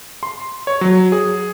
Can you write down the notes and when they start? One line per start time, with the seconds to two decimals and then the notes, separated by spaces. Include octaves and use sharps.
0.23 C6
0.67 C#5
0.81 F#3
1.12 G#4